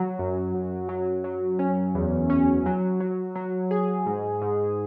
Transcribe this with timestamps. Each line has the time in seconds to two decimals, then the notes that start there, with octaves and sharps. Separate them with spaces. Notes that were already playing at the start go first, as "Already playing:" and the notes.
Already playing: F#3
0.19 F#2
0.54 F#2
0.89 F#3
1.24 F#3
1.59 C#4
1.95 E2
2.30 C#4
2.66 F#3
3.00 F#3
3.35 F#3
3.71 G#4
4.06 G#2
4.42 G#2